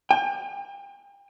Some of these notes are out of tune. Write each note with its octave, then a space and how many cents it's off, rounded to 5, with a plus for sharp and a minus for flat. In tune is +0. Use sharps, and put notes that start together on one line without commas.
G5 +40